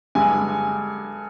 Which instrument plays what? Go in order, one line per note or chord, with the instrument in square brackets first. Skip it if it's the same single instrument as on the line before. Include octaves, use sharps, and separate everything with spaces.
[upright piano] G2 D3 G#3 G#5